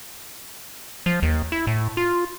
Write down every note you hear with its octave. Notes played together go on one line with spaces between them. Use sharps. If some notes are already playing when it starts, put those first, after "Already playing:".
F3
D#2
E4
A2
F4